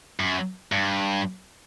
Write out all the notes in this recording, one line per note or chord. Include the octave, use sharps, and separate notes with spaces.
F#2
G2